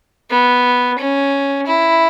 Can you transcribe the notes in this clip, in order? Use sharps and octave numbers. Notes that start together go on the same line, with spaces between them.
B3
C#4
E4